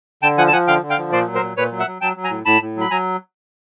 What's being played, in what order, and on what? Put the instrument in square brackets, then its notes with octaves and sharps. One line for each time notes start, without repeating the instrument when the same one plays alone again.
[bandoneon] D3 G5 A5
F3 F#5 G#5
A5
F3 F#5 G#5
D3 F5 G5
D3
F5 G5
F3
A#2 C5 D5
F#3
A#4 C5
A#2
A#2 B4 C#5
F#3
E5 F#5
F#3
F#3 G5 A5
F#3
G#5 A#5
A2
A2 A5 B5
A2
F#3 B5
F#3 G#5 A#5